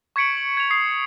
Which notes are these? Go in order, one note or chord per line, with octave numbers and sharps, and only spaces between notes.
C#6 G#6 B6 C#7 D7 F#7
F#7
G#6 F7
D#6 C7